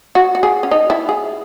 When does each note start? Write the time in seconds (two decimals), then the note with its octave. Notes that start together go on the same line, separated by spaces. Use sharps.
0.15 F#4
0.35 F#4
0.43 G#4
0.63 C#4
0.71 D#4
0.90 E4
1.09 G#4